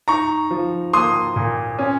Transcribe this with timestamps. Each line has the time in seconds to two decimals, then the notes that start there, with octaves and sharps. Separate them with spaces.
0.08 D#4 A#5 C#6
0.51 F3
0.93 A#3 C6 D#6
1.36 A#2
1.79 C#4